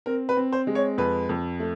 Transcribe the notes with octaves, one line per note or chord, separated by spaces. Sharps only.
C4 A#4
B4
C4
C5
G#3
C#5
F2 B4
F2
A3